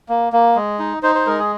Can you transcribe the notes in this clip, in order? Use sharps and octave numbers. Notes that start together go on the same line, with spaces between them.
A#3
A#3
G#3
D#4
D#4 C5
C5
G#3 A#4
G#4